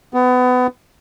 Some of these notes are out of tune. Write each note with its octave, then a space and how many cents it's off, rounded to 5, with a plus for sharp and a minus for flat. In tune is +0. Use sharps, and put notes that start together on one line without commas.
B3 +25